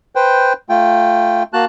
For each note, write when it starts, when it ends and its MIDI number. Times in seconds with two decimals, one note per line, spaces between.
0.16 0.53 71
0.16 0.53 72
0.16 0.53 79
0.69 1.43 57
0.69 1.43 65
0.69 1.43 79
1.53 1.65 58
1.53 1.65 66
1.53 1.65 81
1.53 1.65 90